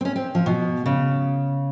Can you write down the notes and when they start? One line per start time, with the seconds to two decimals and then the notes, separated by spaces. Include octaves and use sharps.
0.01 C4
0.05 C#4
0.16 C4
0.35 F3
0.46 B2
0.86 C#3